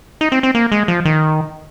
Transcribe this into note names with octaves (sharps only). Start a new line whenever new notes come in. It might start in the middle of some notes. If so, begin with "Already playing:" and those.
D#4
C4
C4
A#3
G#3
F3
D#3